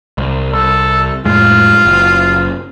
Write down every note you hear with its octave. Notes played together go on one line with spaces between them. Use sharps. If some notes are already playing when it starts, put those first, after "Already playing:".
C2
C2 A4
F2 A2 G#3 F4
F#1